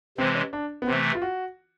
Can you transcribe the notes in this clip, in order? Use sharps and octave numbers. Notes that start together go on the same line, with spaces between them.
C3 E3 G#3 C4
C#4
D4
B3
C3 E3 A3 C4
F4
F#4